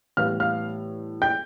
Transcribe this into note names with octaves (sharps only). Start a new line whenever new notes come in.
A2 E3 G3 B3 F5 F6
F5 F6
G5 G6